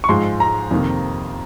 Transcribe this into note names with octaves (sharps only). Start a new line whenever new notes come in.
C#6
G#2 F3 G#3 C6
A#5
F2 C3 D#3 A#3